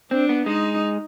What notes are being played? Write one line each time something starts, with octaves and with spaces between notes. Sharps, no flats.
C4 D4
B3
G#3 D#4